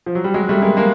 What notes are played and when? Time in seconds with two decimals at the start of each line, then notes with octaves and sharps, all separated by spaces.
0.06 F3
0.15 F#3
0.24 G3
0.34 F#3 G#3
0.49 G3 A3
0.62 G#3 A#3
0.77 G#3 A#3